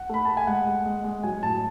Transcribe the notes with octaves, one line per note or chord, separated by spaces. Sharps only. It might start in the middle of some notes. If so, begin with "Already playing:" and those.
Already playing: F#5
A3 B5
A3 A5
G#5
G#3 F#5
G#3
G#3
G#3
F#3 G#5
A2 A5